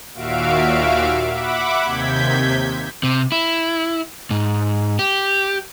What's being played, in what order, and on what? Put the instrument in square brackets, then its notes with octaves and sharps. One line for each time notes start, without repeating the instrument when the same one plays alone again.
[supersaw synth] D#2 A#2 F#4 E5 F5 D7
E5 F#5 B5 D6
D#2 C3 G6 G#6 B6
[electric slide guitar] C3
E4
G#2
G4